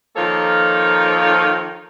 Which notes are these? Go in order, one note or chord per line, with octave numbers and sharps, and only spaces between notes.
D#3 F3 A#3 A4 C#5